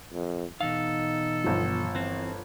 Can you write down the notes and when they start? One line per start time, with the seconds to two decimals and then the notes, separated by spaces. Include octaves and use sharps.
0.12 F2
0.61 B2 E3 D#4 A4 F5
1.44 G1 F3
1.95 E3 C4